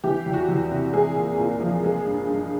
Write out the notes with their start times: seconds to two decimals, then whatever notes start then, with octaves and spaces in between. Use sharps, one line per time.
0.04 E3 G4
0.26 E2
0.33 F#4
0.49 E2
0.71 C3
0.93 G#3 G#4
1.16 A#2
1.38 A#2
1.61 F3
1.83 G#3
2.05 G2
2.28 G2